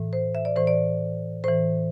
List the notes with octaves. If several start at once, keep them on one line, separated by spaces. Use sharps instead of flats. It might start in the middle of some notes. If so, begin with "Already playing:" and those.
Already playing: A2 E3
C5
E5
D5
A2 E3 C5
D5
A2 E3 C5